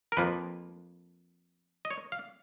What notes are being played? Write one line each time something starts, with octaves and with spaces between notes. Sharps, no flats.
A#4
F2 F3 A#3 B4
D#5
C#5
F5